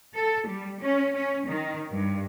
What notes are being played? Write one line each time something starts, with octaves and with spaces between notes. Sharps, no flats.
A4
G3
C#4
C#4
D#3
G2